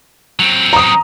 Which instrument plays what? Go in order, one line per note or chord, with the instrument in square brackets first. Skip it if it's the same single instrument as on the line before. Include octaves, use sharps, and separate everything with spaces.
[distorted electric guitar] F#3 C4
[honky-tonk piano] A#5 D#6